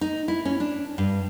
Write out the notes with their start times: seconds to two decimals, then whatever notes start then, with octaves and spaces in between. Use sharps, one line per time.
0.01 D#4
0.28 E4
0.45 C#4
0.60 D4
0.98 G2